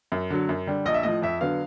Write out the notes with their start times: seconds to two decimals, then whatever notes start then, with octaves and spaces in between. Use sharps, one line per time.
0.12 F#2
0.30 D3 F#3
0.49 F#2
0.67 D3 G3
0.85 A#1 D#5
0.94 E5
1.03 A2 F3 D#5
1.22 F2 E5
1.41 D3 F#3 B3 F5